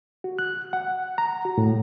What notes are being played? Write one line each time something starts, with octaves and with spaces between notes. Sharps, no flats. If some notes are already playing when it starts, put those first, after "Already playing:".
F#4
F#6
F#5
A#5
F#4
A2